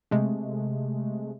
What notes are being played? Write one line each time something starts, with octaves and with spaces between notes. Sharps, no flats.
C3 G#3 A3